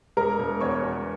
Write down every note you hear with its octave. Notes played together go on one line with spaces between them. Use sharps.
E1 A#4 A#5
E1
E2 C#5 C#6
E1